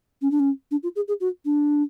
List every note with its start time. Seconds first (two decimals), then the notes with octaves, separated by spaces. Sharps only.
0.22 C#4
0.31 D4
0.40 C#4
0.71 D4
0.83 F4
0.96 G#4
1.08 G#4
1.20 F#4
1.45 D4